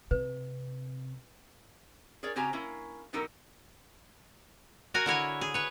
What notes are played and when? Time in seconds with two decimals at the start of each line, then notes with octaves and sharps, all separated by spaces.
0.11 C3 B4
2.23 G#4 A#4 C#5 D5
2.36 C#3 C4 F#4 G4 G#5 A#5
2.53 A#3 C#4 E4
3.13 B2 F#3 D#4 G4 A4 A#4
4.94 F#4 A#4 F#5 G#5
5.06 D3 E4 C#5 G#5
5.41 G#4
5.54 B4 C#5